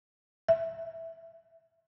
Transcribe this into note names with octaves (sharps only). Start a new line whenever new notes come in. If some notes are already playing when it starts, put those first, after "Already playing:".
E5